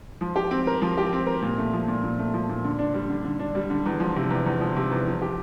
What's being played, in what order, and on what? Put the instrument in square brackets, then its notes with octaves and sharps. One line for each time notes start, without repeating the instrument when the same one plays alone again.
[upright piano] F3
G4
C4
A#4
F3
G4
C4
A#4
A#2
A3
F3
A#2
A#2
A3
F3
A#2
D3
D4
G3
D3
D3
D4
G3
D3
E2
F3
C3
E2
E2
F3
C3
E2
F3
G4